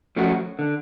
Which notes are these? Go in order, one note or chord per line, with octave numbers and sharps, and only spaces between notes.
F3 A3 C#4 F#4
D3